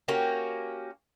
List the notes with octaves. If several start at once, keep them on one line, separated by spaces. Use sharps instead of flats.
A#3 C#4 F#4 G4